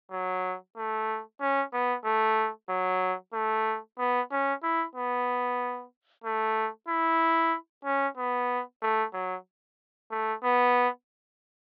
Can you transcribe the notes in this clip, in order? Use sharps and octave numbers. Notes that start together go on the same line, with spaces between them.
F#3
A3
C#4
B3
A3
F#3
A3
B3
C#4
E4
B3
A3
E4
C#4
B3
A3
F#3
A3
B3